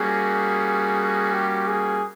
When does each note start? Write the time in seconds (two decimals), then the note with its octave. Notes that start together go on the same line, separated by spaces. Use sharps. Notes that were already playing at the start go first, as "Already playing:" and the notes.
Already playing: G3 A#3 C#4 F#4 G#4
1.33 G4
1.68 G#4